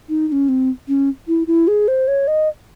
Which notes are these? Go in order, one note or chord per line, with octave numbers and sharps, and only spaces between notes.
D#4
D#4
C#4
C4
C#4
E4
E4
G#4
C5
C#5
D#5